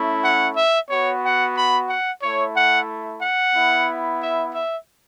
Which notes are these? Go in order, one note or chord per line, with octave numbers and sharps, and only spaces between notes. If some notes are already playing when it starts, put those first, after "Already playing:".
Already playing: A3 C#4 E4
F#5
E5
B3 F#4 C#5
F#5
B5
F#5
A3 E4 C#5
F#5
F#5
B3 E4
E5
E5